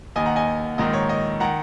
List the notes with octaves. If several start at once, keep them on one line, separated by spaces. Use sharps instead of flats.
D#2 D#3 D#5 G#5
F#5 A#5
D#5 G#5
A#1 G#2 D#3 D#5
C#5
D#5
D#3 F#5 A#5